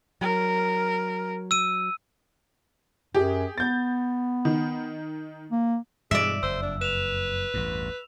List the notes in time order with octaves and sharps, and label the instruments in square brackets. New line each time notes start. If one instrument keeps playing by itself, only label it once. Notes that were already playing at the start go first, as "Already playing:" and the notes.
[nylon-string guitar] F#3 [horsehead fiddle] A#4
[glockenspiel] E6 D#7
[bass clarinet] F#2 [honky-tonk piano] G4 G#4
[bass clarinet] B3 [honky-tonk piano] G6 A6
[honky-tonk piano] D#3
[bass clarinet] A#3
[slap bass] G2 B2 E3 [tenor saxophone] G#3 [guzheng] D5 E5
[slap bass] F#1 F2 [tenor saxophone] C5 [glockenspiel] E6
[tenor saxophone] D4
[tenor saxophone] B4 [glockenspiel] E7 F7
[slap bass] A1 E2 G2